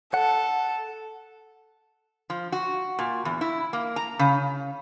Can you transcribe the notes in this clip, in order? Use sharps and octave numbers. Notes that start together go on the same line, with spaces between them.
A4 F#5
F3
F#4
A#2
E2
E4
A#3
A#5
C#3